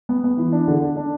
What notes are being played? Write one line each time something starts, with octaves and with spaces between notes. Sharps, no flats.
B3
B3
E3
D4
D3
D4
D4